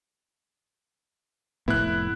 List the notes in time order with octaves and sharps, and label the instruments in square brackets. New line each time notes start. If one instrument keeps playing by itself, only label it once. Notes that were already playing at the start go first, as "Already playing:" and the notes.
[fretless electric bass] F1 A2 B3 [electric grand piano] E4 F#6